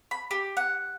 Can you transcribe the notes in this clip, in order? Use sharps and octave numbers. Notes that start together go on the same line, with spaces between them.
B5
G4
F#5